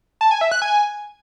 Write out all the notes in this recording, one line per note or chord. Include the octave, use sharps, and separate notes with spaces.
A5
G#5
E5
F#6
G#5